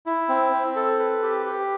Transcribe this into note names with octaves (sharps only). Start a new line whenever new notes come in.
E4
C4
C4
A4
B4
G4
G4